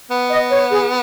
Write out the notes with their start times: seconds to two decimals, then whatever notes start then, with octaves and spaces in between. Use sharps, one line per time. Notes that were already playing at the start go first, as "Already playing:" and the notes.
0.10 B3
0.31 D#5
0.51 C#5
0.72 G#4